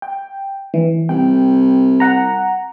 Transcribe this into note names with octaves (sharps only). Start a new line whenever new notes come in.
G5
E3
C2 G5
F#5 A#5